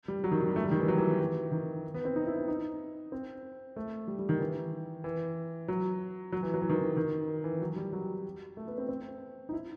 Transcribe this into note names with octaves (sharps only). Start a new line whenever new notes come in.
G3
F#3
D#3
F#3
G3
A3
G3
D#3
E3
F#3
E3
E3
D#3
B3
C4
D#4
E4
D#4
D#4
C4
A3
G3
G3
D#3
E3
E3
F#3
F#3
E3
F#3
E3
D#3
E3
D#3
E3
F#3
G3
F#3
A3
B3
C4
C4
D#4
E4